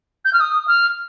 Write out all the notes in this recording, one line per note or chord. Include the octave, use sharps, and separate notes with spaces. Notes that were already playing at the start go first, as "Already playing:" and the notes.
G6
F6
D#6
F6